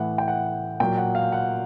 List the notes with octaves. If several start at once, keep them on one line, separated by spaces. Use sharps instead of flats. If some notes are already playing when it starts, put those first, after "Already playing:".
Already playing: A2 E3 F#5
G5
F#5
A#2 F#3 G5
F#5
F5
F#5